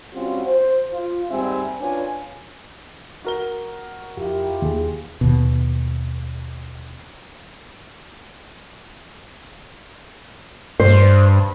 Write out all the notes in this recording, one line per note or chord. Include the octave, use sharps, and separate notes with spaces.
G3 C4 C#4 F4 F#4
C5
F4
D#2 G#2 G3 C4 E5 G#5
C#4 D4 F4 B4 C#5 G#5
F#4 A#4 G7
F2 E4 F4 G4
D#2 G#4
D#2 B2
G2 C5